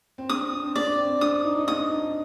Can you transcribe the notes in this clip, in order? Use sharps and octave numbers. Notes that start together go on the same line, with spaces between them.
C4
D4 D#6
D4
C4
D4 D5
C4
D4 D#6
D#4
D#4
D4 D#6
D#4